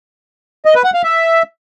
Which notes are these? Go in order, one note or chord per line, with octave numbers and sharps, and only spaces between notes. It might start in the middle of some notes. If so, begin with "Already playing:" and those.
D#5
B4
F#5
F5
E5